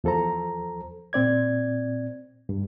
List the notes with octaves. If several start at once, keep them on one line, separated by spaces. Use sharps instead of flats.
E2 F3 A4 C5 A#5
A#2 C4 D5 G#6
G2